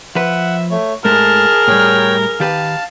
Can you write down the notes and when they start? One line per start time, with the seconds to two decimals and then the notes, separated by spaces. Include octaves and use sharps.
0.15 F3 B4 E5 F#5
0.71 A3 C#5
1.05 G#2 G#3 A3 G#4 A#4 A5 F6
1.68 A2 G3 C#5 G5
2.40 D#3 G4 B4 F5 A5